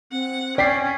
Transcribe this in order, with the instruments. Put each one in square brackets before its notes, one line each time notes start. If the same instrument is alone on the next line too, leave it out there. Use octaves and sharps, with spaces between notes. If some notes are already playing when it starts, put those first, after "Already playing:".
[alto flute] C4 [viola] F#5
[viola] C#4 [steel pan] D5 [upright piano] G5 B6 C7